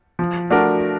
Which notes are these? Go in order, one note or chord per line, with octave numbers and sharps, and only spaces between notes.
F3
A3 D4 F#4 A#4